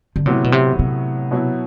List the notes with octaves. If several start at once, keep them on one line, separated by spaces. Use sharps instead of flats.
D3
A2 C3 F#3 B3 E4
B2
C3
C3
B2 F#3 B3 E4